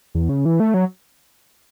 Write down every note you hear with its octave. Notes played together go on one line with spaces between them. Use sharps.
E2
C#3
E3
A3
F#3